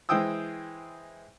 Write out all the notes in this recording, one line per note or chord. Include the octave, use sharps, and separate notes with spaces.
E3 G#3 C5 G5 D#6 E6